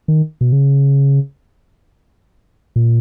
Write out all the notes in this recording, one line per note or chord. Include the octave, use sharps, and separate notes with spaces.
D#3
B2
C#3
A#2